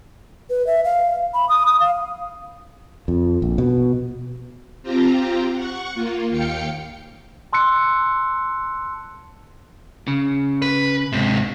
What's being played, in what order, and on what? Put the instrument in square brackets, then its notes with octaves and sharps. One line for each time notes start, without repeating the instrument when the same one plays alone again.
[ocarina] B4
E5
F5
B5
D#6
D#6
F5
[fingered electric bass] F2
A#1
B2
[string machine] C4 F4 G4 A#5
F#5 C#6
A#3 F4
D#2 F5 G5 C#7
[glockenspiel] A5 C6 E6 F#6 C#7
[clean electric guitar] C#3
[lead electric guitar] B4
G#2 C3